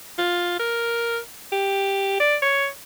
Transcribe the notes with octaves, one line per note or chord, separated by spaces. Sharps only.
F4
A#4
G4
D5
C#5